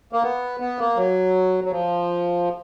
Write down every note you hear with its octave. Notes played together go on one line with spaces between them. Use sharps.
A#3
B3
B3
A#3
F#3
F#3
F3